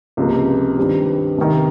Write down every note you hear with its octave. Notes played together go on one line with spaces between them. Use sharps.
C#2 C3 F3 A#3
G2 D#3 G3 C4
C2 C3 D#3